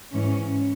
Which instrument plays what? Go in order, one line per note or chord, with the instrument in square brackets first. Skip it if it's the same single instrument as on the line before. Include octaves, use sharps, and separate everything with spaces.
[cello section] G#2 E3 C#4